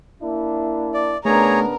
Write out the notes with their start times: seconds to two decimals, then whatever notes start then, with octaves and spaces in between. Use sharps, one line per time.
0.21 A#3 D4 E4
0.94 D5
1.25 C#3 A3 B3 D4 G#4 A#4 C#5 A#5